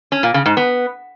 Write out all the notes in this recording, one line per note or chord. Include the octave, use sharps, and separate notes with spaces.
C#4
A#2
C#3
G#2
B3